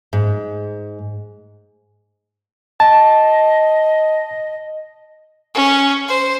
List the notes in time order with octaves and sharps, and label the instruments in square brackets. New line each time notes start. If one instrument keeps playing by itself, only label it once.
[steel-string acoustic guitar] G#2
[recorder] D#5 [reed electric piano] A5
[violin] C#4
C5